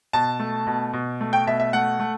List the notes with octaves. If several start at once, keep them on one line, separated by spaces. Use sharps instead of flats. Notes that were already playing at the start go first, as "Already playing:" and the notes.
B2 A5
A3
B2
B2
A3
G5
B2 E5
E5
A3 F#5
A3